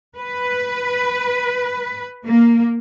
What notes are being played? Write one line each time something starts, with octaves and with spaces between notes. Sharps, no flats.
B4
A#3